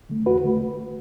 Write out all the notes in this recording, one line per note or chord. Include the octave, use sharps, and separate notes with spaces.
D3 A3
E2 F#4 B4
D3 A3